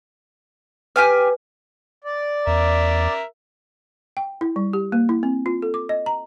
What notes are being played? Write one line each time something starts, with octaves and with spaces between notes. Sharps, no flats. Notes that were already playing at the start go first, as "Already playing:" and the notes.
G4 B4 G#5 F6
D5
E2 A#4 E5
G5
E4
G3
G4
A#3
E4
C4
F4
A4
D6
D#5
A#5